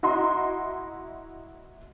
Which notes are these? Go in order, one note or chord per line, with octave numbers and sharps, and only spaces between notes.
E4 F#4 D#5 A#5 C6